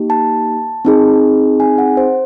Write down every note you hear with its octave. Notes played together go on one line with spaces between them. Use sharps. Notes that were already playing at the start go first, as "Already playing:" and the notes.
Already playing: A#3 D#4 G4
A5
C4 D#4 G#4
G#5
F#5
C5